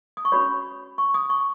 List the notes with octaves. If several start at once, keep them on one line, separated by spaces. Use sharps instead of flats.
D#6
C#6
C#4 F#4 C#5 B5
C#6
D#6
C#6